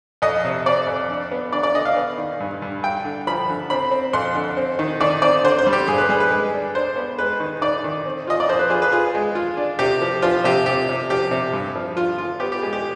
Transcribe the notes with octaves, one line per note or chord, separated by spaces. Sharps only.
F2 D#5
C3
C4 D5
F2
D4
B3
D3 D5
D5
D3 D#5
F5
B3
D#3
G2
G2
G2 G5
D3
F3 B5
D3
C4 B5
C4
F2 C6
D3
C4
D#3
D#3 D5
C4 D5
D3 C5
C5
G3
G4
G2 G#4
B4
G3 G#4
B4
G#3
D4
D4 C5
B3
G#3 B4
D#3
D#3 D5
D#3
C4
F4 D#5
D5
F3 C5
B4
F4 G#4
B4
F4 G#4
G#3
F4
D4
C3 G4
F3
F3 F4
C3 G4
C3 G4
C3
F3 G4
C3
G2
F3
F4
F4
B3 G4
G4
G#3
G4